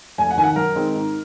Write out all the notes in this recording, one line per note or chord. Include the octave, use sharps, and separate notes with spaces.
F1 G#5
F#5
D#2 D#3 G#5
F#5
F#2 A#4
D#3 G#3 C4
G#2